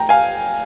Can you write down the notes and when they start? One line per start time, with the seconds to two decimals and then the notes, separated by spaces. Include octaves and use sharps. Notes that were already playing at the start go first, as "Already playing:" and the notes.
Already playing: G5 A#5
0.09 F5 G#5